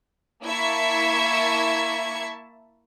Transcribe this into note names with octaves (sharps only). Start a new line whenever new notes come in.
A#3 E4 E5 A5 C#6 G#6